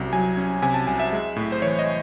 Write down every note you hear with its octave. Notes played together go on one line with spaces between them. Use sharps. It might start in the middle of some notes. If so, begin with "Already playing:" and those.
Already playing: C2 C3 F#3 C#4
F#3 G#5
C#4
C3 G#5
A5
C2 G#5
E5
G#3
A2
C5
E3 C#5
D#5